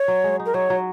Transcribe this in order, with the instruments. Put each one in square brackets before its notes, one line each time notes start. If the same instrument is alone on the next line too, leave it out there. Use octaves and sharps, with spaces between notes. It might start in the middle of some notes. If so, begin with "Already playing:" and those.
Already playing: [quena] C#5
[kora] F#3
G#3
D#4
[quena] A#4
[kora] F#3 [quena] C#5
[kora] F#3